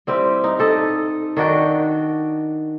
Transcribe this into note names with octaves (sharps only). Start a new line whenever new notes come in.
G3 C4 E4 G4
D#4
G4 A4 D#5
D#3 D4 F#4 G5